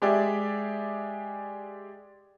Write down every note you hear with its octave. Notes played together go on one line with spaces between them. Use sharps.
G#3 G4 G#4 D5 E5